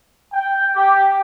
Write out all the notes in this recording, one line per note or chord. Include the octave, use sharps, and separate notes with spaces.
G5
G4